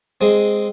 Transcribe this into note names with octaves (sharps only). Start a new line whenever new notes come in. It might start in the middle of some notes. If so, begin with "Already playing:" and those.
G#3 C4